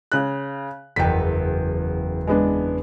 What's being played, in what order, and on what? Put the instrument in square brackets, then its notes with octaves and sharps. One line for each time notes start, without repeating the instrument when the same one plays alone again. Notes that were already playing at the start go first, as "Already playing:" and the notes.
[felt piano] C#3 F#6
[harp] F#1 E2 [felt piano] G5 B6
[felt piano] G#3 B3 D4